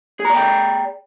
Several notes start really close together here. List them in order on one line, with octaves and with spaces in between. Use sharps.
G#4 A#5 D5 G5